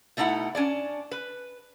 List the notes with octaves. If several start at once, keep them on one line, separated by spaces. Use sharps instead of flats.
B2 A3 D#4 E4 F#5
C#4 D4 D5
B4